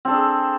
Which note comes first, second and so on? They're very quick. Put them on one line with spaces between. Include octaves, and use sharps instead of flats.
C4 A4 D4 G#4